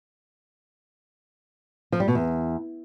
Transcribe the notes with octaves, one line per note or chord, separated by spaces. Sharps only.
F3
G3
B2
E2